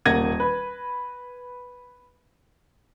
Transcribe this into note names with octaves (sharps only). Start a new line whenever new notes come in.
D#1 A#3 F#5 G#6 A#6 D#7
B4